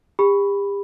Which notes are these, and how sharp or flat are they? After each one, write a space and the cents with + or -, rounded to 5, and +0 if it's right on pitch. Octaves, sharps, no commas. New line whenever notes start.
G4 +40 B5 +0